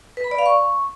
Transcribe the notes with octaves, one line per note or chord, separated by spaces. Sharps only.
B4
B5
D5
F5
C#6